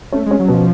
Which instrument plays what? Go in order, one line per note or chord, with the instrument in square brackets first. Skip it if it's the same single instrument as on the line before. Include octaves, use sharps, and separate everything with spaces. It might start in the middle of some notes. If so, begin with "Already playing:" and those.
[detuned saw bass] A3 [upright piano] C#4
[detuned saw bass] G#3
[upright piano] C#4
[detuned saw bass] F#3
[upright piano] B2
[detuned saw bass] F3